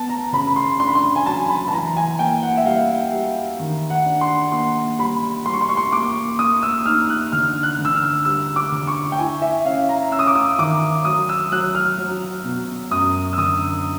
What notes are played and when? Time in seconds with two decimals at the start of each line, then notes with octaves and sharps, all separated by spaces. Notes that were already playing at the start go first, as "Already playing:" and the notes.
Already playing: B3 A5
0.09 A#5
0.32 C#3 B5
0.47 B5
0.56 C6
0.79 D4 C6
0.87 B5
0.95 C6
1.16 G#5
1.26 F#3 A5
1.49 B5
1.68 A5
1.72 E3 A#5
1.97 G#5
2.19 A#3 G5
2.43 F#5
2.57 E5
2.66 G3 F5
3.13 G3
3.60 D#3
3.90 F#5
4.06 D4
4.21 C6
4.52 A#3 C6
4.99 G3 B5
5.46 G3 C6
5.54 C#6
5.61 C6
5.69 C#6
5.77 C6
5.92 A#3 D6
6.39 A#3 D#6
6.62 E6
6.85 D#4 F6
7.09 F#6
7.32 D3 F6
7.63 F#6
7.79 D3
7.85 E6
7.95 F6
8.25 G3 E6
8.56 D6
8.72 D3
8.87 C#6
9.12 G5
9.18 E4 G#5
9.42 E5
9.65 C#4 F5
9.89 A#5
10.12 C#4 E6
10.19 D#6
10.27 D6
10.35 D#6
10.59 D#3 D6
11.05 F#3 D#6
11.29 E6
11.52 F#3 F#6
11.75 F6
11.98 F#3
12.45 B2
12.91 F#2 D#6
13.33 E6
13.38 D3 D#6